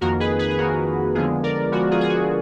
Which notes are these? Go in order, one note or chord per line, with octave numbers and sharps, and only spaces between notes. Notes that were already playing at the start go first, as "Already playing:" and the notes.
F2 D#3 A#3 F#4 A#4
G#4 B4
G#4 B4
G#4
F2 D#3 A#3 F#4 A#4
D3 F3 G#3 B3 F4 G#4
A#4 D5
D3 F3 G#3 B3 F#4 A#4
F4 G#4
G#4
F#4